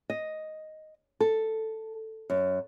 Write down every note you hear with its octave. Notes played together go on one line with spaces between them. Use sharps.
D#5
A4
F#2